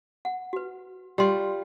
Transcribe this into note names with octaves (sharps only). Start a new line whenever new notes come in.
F#5
F#4 B4
G3 F4 G4 C6